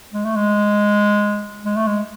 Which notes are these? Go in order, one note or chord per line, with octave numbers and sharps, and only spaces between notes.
G#3
A3
G#3
G#3
A3
G#3